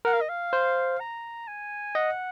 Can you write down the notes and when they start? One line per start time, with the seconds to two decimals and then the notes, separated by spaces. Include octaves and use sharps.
0.05 A#4 F#5
0.13 F5
0.21 D#5
0.29 F5
0.53 C5
1.00 A#5
1.47 G#5
1.95 D#5 F#5